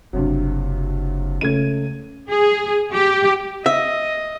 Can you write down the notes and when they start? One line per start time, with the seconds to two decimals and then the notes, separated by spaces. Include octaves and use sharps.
0.13 F#1 G2 C3 F#3
1.41 C#2 A3 C#4 G#6 D#7
2.31 G#4
2.95 G4
3.66 D#5 E5